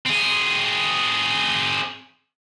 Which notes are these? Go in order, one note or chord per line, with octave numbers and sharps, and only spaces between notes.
C4 G#4